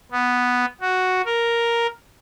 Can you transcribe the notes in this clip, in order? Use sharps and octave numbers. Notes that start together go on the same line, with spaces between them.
B3
F#4
A#4